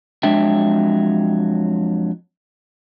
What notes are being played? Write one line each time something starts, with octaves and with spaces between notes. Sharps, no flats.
F2 F#3 G#3 D4 E5 G5